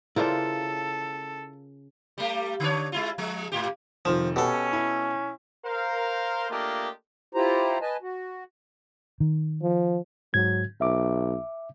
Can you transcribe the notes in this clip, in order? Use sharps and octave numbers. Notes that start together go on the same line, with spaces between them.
C#3 E4 F4 A4 A#4 C5 D5
G3 A3 G4
D3 D4 C#5
G#3 E4 F4
F3 G#3
G#2 F4 G4
F1 D#3 F3 E7
B2 C#4 F#4 G4 A4
E4
A#4 C5 F5
A3 A#3 D4 F4 G4 D#5
E4 F4 G4 C5 A#5
B4 D#5 G#5 A5
F#4
D#3
F3
G#2 F#3 G#6
B1 E5 D6